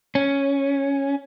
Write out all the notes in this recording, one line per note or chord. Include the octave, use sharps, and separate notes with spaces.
C#4